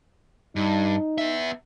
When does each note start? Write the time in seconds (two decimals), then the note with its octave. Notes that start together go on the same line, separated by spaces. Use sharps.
0.56 G2 D#4
1.18 B3 E5